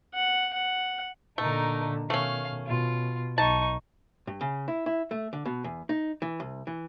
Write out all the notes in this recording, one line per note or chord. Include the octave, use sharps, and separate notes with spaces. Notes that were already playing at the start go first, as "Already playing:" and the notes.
F#5
F#5
A#2 D3 A3 D#4 A#4
B2 D#3 A3 C#4 F5
B2 F4
B1 D#4 A5 C#6
G2
C#3
E4
E4
A3
D3
B2
E2
D#4
E3
C2
E3